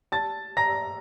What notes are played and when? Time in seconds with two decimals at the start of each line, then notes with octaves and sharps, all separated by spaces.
0.12 A5 A6
0.57 A#5 A#6